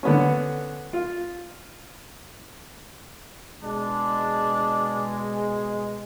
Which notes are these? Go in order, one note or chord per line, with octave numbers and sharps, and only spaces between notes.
D3 B3 C#4
F4
B2 G#3 D4